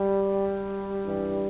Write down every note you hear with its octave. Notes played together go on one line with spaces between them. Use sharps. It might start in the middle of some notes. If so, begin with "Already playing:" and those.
Already playing: G3
G2 E3